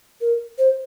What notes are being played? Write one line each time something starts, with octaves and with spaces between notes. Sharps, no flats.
A#4
C5